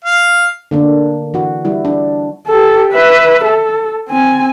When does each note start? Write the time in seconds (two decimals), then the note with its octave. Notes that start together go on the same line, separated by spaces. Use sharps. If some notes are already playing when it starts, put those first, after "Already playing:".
0.04 F5
0.71 D3 A#3 D4
1.34 E3 F#4
1.65 G3 E4
1.85 D4
2.47 G4 A4
2.93 B4 E5
3.45 A4
4.09 C4 G#5